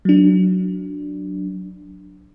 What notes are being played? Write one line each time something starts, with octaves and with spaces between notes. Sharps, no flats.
F#3 D4